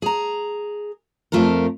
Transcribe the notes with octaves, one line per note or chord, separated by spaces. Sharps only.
G#4 A#5
F2 A3 F4 A4 A#4